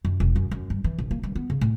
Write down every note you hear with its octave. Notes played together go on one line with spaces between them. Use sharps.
F#2
E1
F#2
F#2
G2
E3
A#1
A#3
G2
B3
C#3
A2